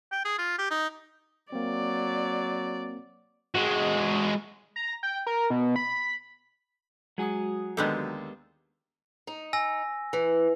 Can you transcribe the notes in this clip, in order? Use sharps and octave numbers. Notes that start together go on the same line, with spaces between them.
G5
G#4
F4
G4
D#4
F#3 A#3 C4 D5
G#3 F#4
A#5
G5
A#4
B2
B5
F#3 G#3 F#4 G#4 D#6
D#2 D3 G#3 B3 G4 A4 E6
D#4
G#5 E6 A#6
E3